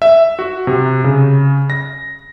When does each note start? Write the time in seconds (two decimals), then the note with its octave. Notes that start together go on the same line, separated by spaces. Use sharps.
0.02 E5
0.39 F#4
0.67 C3
1.04 C#3
1.70 A#6